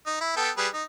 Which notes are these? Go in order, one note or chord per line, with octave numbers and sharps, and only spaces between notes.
D#4
E4
B3 A4 G5
G3 G#4 B4
D#4